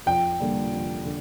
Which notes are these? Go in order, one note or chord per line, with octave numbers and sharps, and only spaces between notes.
F2 G5
D3 G3 A#3
F2
D3